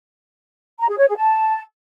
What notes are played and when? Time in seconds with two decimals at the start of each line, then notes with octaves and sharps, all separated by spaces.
0.80 A#5
0.89 G#4
0.98 C#5
1.08 G#4
1.17 A5